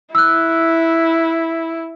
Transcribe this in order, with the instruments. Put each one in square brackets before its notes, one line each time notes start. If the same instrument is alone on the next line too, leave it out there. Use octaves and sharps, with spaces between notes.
[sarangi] E4 [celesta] E6 F#6